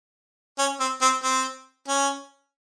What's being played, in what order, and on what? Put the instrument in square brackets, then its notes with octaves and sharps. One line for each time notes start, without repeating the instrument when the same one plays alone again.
[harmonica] C#4
C4
C4
C4
C#4